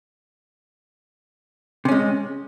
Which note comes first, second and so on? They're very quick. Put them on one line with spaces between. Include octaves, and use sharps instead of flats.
C3 C#4 G#3